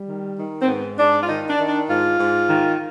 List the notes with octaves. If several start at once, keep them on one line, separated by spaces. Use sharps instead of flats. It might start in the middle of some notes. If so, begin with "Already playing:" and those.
Already playing: G3
D#3
D#3
C4
G#2 B3
G#2 D4
F4
D#3 D#4
D4
D#3
D4
G#2 F4
G#2
D#3